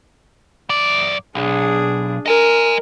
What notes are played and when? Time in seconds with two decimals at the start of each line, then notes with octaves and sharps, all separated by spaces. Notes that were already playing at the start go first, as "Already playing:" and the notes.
0.69 F#2 D5
1.35 B1 D4 G#4
2.26 A#4 D#5 G#5